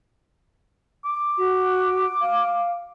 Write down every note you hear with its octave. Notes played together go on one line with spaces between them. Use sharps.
D6
F#4
F5